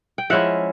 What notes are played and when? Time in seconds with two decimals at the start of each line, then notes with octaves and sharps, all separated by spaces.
0.18 G5
0.30 F3 G#3 C#4 E4 E5 F#5